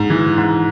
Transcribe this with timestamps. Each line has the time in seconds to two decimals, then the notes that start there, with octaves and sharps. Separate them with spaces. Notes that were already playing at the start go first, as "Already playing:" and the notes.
Already playing: G#2
0.10 E3
0.37 G#2